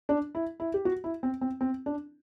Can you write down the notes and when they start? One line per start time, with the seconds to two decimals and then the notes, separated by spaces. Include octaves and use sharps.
0.09 D4
0.35 E4
0.60 E4
0.74 G4
0.85 F#4
1.04 E4
1.23 C4
1.41 C4
1.61 C4
1.86 D4